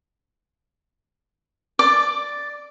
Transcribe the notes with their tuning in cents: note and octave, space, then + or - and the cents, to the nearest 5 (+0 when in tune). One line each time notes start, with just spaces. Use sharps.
D5 +0 D6 +15